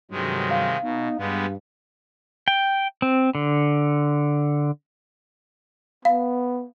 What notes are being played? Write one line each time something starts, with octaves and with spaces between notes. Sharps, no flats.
G2 C3 D#3 F#3 G#3
F5
B2 B3 D#4
G2 G3 G#3 B3
G5
C4
D3
B3 F5